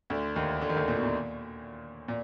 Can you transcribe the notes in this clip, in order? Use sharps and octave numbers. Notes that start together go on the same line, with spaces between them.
D2 D3
D#2 D#3
D3
D#3
D2 D3
A#2
B2
A#2
A#2